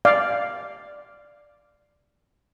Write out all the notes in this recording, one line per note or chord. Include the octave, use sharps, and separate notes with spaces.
D5 F5